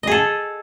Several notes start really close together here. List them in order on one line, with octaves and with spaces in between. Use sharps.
D#5 G#4 A4